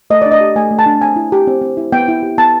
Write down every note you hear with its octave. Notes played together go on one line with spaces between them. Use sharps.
A3 D#5
D4 D5
D#5
G4
A3 G#5
A3
A5
D4
C4 G#5
E4
G4
C4
C4
E4
B3 G5
E4
G4
B3 A5